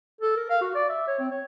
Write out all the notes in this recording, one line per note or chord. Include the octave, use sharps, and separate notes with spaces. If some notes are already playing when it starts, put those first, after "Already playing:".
A4
A#4
F5
F#4
D5
E5
C#5
C4
C#5